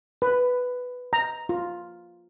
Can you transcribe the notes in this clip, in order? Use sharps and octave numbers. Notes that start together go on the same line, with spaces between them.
B4
A#5
F4